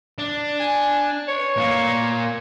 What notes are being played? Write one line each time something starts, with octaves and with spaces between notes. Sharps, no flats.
D4
G#5
C#5
A#2 A#3